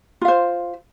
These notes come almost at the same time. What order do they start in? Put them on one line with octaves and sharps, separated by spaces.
F4 F5 C5